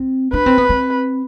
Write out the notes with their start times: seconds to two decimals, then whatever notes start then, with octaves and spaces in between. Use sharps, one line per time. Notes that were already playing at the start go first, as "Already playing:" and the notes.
Already playing: C4
0.33 D4 B4
0.46 C4
0.58 B3
0.69 C4